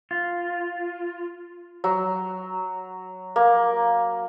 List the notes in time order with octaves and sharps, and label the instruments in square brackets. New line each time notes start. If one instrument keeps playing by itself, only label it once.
[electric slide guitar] F4
[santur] F#3
A#3